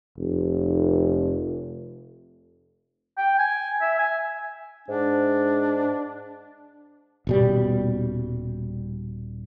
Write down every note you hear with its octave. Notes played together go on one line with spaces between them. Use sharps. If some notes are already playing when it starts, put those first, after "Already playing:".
F1
G5
G#5
E5
G#5
G#2 D4
D#1 B2 G3